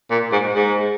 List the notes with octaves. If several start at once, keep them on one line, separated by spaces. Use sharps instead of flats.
A#2
G#2
G#2